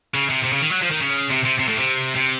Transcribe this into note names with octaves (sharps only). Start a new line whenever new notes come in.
C#3
C3
C3
C#3
D#3
F#3
F3
D#3
C#3
C3
C3
C3
A2
C3
C3